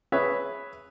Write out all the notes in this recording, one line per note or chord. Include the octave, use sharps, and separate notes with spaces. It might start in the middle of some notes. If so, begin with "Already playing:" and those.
G#4 B4 C#5 E5